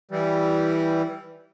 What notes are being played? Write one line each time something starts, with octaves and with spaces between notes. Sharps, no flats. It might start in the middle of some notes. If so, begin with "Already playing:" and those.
E3 G3